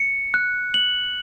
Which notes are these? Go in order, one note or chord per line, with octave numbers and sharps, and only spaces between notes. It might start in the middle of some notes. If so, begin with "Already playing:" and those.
Already playing: C#7
F#6
F#7